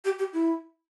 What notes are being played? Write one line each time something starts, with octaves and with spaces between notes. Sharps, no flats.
G4
G4
E4